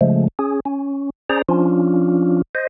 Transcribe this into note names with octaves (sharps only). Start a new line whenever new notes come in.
C#3 F3 G#3 A3
C#4 G#4
C#4
C#4 G#4 C5 D5 A#5
F3 C#4 D4 F4
C5 D#5